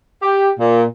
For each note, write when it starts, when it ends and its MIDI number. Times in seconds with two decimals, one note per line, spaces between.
0.23 0.49 67
0.59 0.83 46